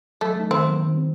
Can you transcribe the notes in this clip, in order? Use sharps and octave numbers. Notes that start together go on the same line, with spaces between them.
F#3 A3
A3 D#4
D#3 C4
F#3 A#3
D#3
G3 C4